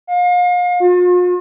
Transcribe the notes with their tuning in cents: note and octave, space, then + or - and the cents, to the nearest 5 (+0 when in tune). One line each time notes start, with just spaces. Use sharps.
F5 +35
F4 +45